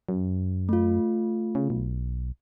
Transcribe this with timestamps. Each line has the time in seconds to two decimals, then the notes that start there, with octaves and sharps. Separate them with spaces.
0.09 F#2
0.69 A3 F4
1.55 C#3
1.70 B1